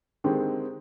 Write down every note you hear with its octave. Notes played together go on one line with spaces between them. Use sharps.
D3 D#3 G#3 C4 G4